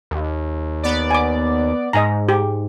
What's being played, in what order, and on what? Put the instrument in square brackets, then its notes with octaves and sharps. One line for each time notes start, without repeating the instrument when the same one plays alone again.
[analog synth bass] D#2
[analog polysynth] B3 D5
[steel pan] G#5 D6
[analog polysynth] G#2 [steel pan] D#5 G#5 A#5
[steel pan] G4